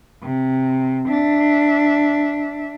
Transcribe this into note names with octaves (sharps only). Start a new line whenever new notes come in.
C3
D4 E5